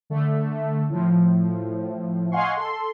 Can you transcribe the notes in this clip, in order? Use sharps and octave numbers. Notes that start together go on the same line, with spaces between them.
D3 A3
A2 F3
D#5 F5 F#5 G#5 C6 C#6
A4 C6